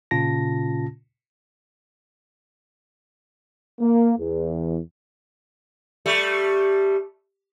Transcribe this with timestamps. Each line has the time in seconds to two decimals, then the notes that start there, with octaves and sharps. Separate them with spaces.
0.11 A#2 C#3 C#4 F4 A5 A#6
3.81 A#3
4.19 E2
6.06 G3 A3